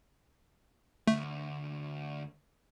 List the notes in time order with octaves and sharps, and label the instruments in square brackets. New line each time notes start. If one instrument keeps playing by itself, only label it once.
[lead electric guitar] D2 [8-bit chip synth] A3